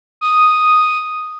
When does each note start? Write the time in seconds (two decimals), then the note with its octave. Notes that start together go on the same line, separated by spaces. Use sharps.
0.21 D#6